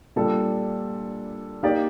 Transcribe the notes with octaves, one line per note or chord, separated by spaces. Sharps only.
A#2 G3 D4 A4
A#3 D#4 G4 D5